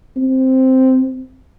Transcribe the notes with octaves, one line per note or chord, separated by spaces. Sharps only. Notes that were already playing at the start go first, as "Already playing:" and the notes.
C4